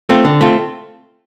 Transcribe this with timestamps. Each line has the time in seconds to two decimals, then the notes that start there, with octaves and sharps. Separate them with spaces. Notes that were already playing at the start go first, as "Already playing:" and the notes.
0.09 A3 C4 F4
0.25 D3
0.41 A3 C4 F4